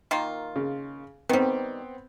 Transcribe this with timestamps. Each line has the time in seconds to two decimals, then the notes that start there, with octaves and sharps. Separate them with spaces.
0.11 D#3 A#3 F4
0.56 C#3
1.29 D#3 G3 B3 C4